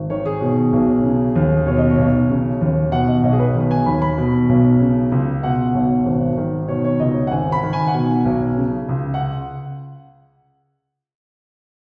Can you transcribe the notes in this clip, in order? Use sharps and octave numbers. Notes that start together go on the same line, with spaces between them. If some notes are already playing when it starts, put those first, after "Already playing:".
Already playing: G#1
D#3 C#5
G#4
B2
B1
C#3
D#2
B2 C#5
D#5
C#5
B1
C#3
D#2
B2 F#5
D#5
B1 D#5
G#4
B4
D#3
G#5
D#2 B5
B5
B2
B1
C#3
C#2
B2 F#5
B1
G#1
D#3
B2 C#5
C#5
C#2 D#5
F#5
G#1 G#5
B5
D#3
G#5
F#5
B2 G#5
B1
C#3
C#2
F#5